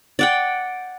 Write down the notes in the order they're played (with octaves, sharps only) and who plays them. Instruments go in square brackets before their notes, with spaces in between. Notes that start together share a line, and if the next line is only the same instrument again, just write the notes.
[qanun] D5 F#5 G5